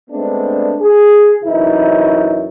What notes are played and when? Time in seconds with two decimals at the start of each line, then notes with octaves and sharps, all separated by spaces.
0.10 G#3 A3 B3 C4 D4
0.81 G#4
1.43 F#2 C3 E3 D#4 E4